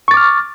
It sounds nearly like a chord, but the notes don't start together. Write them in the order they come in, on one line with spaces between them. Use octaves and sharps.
C#6 A6 D6 F6